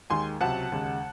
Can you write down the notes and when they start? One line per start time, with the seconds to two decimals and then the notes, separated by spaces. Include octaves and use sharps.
0.10 D#2 D#3 G#3 G#5 C6
0.41 C#2 C3 F#3 F#5 A5
0.72 D#2 C#3 G#3